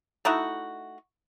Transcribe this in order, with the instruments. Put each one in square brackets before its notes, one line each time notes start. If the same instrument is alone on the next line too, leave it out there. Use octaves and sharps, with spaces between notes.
[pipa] A3 D#4 E4 F#4